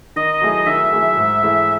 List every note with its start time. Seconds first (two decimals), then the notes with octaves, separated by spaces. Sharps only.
0.16 D#3 D#5
0.41 F#3 A3 E4 G#4
0.66 D#3 E5
0.93 F#3 A3 E4 G#4
1.17 G#2
1.42 E3 A3 E4 G#4